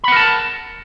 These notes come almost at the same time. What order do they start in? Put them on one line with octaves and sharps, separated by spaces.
B5 F#5 A#4 A5